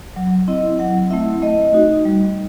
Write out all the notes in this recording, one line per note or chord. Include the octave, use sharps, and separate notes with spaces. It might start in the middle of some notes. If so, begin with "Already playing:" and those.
F#3
C4 E4 D#5
F#3 F#5
A3 C4 E4 E5
A3 D#5
D#4 F#4
G3